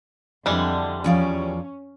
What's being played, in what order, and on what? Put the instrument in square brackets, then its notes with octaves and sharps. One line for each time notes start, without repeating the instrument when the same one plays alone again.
[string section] F2 D3 [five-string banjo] E3 G3 G#3
[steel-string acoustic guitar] E2 F3 D5 [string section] C#4